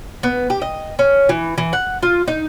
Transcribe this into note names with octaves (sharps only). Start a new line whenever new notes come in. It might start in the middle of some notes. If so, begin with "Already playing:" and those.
B3
G4
D#5
C#4
E3
E3
F#5
F4
D#4